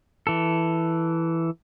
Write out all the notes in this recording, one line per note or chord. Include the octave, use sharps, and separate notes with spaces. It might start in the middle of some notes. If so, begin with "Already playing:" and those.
E3 A4